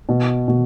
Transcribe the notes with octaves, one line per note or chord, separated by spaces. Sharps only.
B2
B2